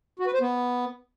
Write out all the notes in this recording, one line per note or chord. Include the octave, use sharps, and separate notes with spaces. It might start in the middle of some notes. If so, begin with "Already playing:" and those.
F#4
B4
C5
B3